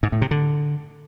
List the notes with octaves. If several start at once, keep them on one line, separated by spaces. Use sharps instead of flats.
G#2
A2
C3
D3